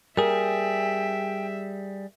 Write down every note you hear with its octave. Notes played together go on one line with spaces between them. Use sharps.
G3 G#4 A#4 E5 G5